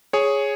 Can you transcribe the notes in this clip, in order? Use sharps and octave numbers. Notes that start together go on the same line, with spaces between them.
G#4 C#5